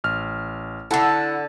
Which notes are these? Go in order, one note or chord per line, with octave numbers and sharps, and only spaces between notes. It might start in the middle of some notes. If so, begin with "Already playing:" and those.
A1 F6
D3 E4 A4 F#5 A5